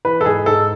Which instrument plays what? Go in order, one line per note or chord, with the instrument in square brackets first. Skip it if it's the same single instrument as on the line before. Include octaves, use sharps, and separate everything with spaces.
[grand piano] E3 B4
A4
G#2 G#4
G#2 A4